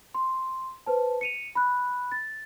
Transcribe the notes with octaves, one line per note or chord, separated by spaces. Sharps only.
C6
B4 C5 A5
C#7 D#7 F7
B5 F#6
A6